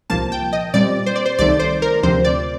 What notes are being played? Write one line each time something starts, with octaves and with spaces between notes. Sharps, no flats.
C2 A#2 F3 A#3 A5
G5
D#5
A#2 G3 C4 D5
C5
D5
C5
C2 C3 D#3 A3 D5
C5
A#4
D2 C3 F3 C4 C5
D5